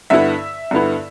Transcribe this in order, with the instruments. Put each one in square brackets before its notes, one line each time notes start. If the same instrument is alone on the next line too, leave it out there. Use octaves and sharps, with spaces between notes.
[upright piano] G2 D3 B3 E4 E5
G2 D3 B3 E4